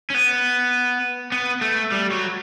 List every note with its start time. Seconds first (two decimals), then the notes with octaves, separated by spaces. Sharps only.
0.10 C#4
0.14 B3
1.32 B3
1.61 A3
1.92 G3
2.12 F#3